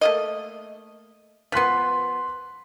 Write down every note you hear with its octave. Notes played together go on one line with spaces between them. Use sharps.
A3 A#3 D#5
F3 B3 C6 F#6 B6